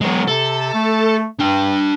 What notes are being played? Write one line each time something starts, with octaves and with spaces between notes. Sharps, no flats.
F#3 G#3 B3
C3 A4
A3
G2 D4 G5